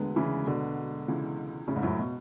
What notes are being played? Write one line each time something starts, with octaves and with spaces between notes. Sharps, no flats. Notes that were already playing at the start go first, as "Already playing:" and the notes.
Already playing: E1 D2 D3 G#3 B3
C#3 E3
B2 D3
C#2 C#3 E3 G#3
A2 C#3
G#2
F#2 A2
B2